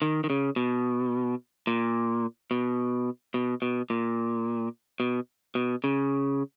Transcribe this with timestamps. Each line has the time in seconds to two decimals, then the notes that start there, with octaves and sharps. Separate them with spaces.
0.02 D#3
0.24 D#3
0.30 C#3
0.56 B2
1.67 A#2
2.51 B2
3.34 B2
3.62 B2
3.90 A#2
5.00 B2
5.55 B2
5.84 C#3